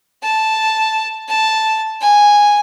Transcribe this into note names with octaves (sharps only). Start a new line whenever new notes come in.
A5
A5
G#5